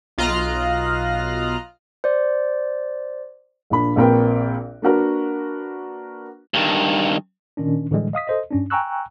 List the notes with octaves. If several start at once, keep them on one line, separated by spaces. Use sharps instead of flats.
B1 F4 D#5 A#5 F6 F#6
C5 D5
A#1 A#2 D4 B5
A#1 A#2 C4 A#4 B4 G5
A#3 D4 F#4 A#4 B4
G2 D#3
A#2 D#3 C#4 D4
A2 D3 E3 G3 G#3
D#5 F5 D#6 B6
A4 C5 D#5
G2 C#4 D4
G5 G#5 A#5 C#6 E6 F#6